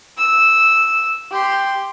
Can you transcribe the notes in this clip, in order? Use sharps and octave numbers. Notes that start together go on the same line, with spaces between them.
E6
G4 C6